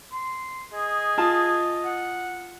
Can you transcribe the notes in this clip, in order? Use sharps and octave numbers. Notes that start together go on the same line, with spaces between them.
C6
G#4 D#5
F4 A5
F#5